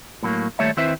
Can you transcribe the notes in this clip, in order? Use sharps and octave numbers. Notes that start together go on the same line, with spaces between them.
A2 F#3 A#3
D#2 G3 A3 C#5 E5
D#3 C4 E4 B4 C5 E5